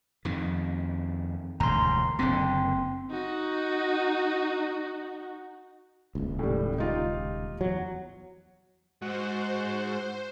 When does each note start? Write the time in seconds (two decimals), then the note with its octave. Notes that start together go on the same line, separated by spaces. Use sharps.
0.25 F2 D#3
1.60 E1 D2 G2 A#5 C6
2.19 F#1 D3 C4 C6
3.10 D#4 F#4
6.15 D#1 C#2
6.39 A2 G3
6.78 D#4 F4 G4
7.61 E2 F#3
9.02 G#2 F#4 C5